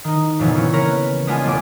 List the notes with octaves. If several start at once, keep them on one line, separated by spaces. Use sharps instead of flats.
D#3 D#4
F2 A#2 C#3 E3 B3
C#3 E3 C#4
A#3 A#4 B4 C#5
G#3 B3 D4 F4 G#5
E1 A3 G#5 D6